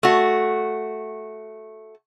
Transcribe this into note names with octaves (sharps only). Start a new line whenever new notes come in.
A3 F#4